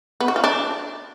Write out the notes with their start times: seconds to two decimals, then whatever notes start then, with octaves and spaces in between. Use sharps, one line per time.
0.20 B3
0.28 F#4
0.36 F4
0.44 D4